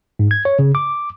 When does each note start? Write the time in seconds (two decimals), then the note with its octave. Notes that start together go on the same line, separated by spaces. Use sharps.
0.19 G#2
0.31 G#6
0.45 C#5
0.59 C#3
0.75 D6